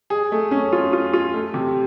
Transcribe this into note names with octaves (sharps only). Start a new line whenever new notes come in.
G#4
A3
C#4
F4
F4
F4
A3
C3